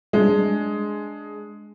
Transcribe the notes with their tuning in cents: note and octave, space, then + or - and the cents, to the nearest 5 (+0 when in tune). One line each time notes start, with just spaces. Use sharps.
G#3 +10 D4 +0